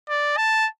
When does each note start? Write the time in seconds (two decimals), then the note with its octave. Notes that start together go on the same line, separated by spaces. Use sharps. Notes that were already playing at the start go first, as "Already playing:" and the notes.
0.09 D5
0.37 A5